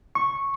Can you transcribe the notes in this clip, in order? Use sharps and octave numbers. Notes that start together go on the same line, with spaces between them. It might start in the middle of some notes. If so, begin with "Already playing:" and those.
C#6